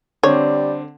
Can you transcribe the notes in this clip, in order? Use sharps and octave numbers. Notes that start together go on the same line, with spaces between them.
D3 G3 C4 C#5